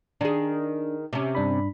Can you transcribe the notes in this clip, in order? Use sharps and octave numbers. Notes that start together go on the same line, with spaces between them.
D#3 D4 G#4
C3 C#4
G2 D4 B5